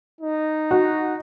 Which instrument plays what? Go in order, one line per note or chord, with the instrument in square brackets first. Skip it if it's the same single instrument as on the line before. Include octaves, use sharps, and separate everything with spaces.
[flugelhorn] D#4
[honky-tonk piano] F#4